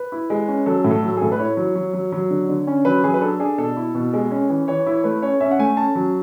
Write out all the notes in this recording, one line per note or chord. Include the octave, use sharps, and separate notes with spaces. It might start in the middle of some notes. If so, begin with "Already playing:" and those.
Already playing: B4
E4
G#3
C#4
F#3 A4
A2
A4
F#3
G#4
A2 A4
B4
E4 C#5
F#3
F#3
F#3
F#3
D3
D3
C#4
F#3 B4
F#3 G#4
B4
D4 A4
D4 G#4
B2 A4
E4
B2
G#3
C#4
E3
E3 C#5
E4
A3 B4
C#4 C#5
C#4 E5
F#5
A3 G#5
C#4 A5
F#3